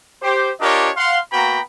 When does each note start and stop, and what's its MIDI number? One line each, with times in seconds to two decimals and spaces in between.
0.22 0.51 67
0.22 0.51 72
0.61 0.89 62
0.61 0.89 65
0.61 0.89 67
0.61 0.89 70
0.61 0.89 73
0.61 0.89 75
0.96 1.19 77
0.96 1.19 78
0.96 1.19 84
1.32 1.60 58
1.32 1.60 59
1.32 1.60 66
1.32 1.60 79
1.32 1.60 82
1.32 1.60 83